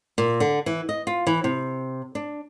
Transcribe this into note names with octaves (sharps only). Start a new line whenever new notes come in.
A#2
D3
E3
D#5
F4
E3
C3
D4